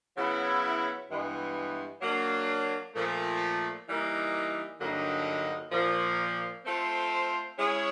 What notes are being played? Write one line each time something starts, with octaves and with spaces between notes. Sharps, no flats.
C#3 F#3 B3 E4
G2 E3 G#3 B3
F#3 A#3 D4
A#2 F3 A3
E3 G3 A#3 D#4
G2 D3 F#3 A#3 D#4
A#2 F3 A#3
A3 C4 F4 A4 C5
G#3 C#4 E4 G#4 C#5